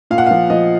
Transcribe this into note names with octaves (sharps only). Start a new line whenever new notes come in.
A#2 F5
F#5
F3 F5
F3 D#5